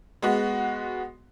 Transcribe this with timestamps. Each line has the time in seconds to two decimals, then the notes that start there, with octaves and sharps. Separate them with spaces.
0.22 G#3 B3 F#4